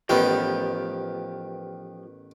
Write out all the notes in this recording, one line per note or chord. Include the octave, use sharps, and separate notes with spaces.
A1 D#3 F3 B3 G4